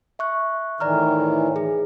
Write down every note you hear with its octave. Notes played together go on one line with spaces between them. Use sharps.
E5 C#6 F#6
A2 D#3 E3 D5 A#5 F6
G#4